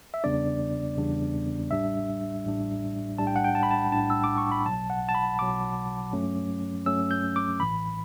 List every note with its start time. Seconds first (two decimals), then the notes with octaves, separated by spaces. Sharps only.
0.14 E5
0.24 E2 C#3 G3 B3 D4 D5
0.97 E2 C#3 G3 B3 D4
1.71 A1 A2 G3 D4 E5
2.45 A1 A2 G3 D4
3.18 B1 A2 G3 D4 A5
3.27 G5
3.36 F#5
3.44 G5
3.55 A5
3.63 B5
3.71 A5
3.92 B1 A2 G3 D4 A5
4.10 E6
4.24 D6
4.38 C#6
4.52 B5
4.66 B1 B2 F#3 A5
4.90 F#5
5.09 A5
5.15 B5
5.39 B1 B2 F#3 D6
6.12 G2 F#3 A3 C#4
6.86 G2 F#3 A3 C#4 E6
7.11 G6
7.36 D6
7.60 A1 A2 E3 B5